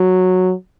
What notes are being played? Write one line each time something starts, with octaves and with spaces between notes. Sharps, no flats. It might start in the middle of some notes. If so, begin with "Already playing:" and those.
Already playing: F#3